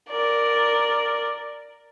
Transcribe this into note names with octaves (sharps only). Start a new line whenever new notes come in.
A#4 D5